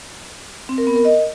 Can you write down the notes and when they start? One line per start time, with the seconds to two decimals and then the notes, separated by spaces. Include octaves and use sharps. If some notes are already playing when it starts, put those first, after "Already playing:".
0.69 C4
0.78 A#4
0.87 B3
0.96 A#4
1.05 D#5